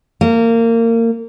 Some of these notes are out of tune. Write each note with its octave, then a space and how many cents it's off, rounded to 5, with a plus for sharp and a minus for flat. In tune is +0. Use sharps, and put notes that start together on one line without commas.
A#3 -25